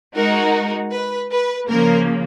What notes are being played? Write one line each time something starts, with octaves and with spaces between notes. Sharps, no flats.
G#3 D#4 F#4 A#4
B4
B4
C#3 F3 A#3 A#4